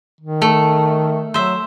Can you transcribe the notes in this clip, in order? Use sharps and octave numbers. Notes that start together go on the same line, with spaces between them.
D#3
A3
F#3 C5 E5